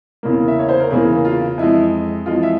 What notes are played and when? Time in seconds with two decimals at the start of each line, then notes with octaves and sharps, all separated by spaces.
0.23 E2 C#3 E3 A#3
0.48 E5
0.59 C#5
0.69 C5
0.80 A#4
0.91 E2 C#3 E3 A#3 G#4
1.25 F4
1.58 F2 E3 G#3 E4
2.26 F2 E3 G#3 F4
2.43 E5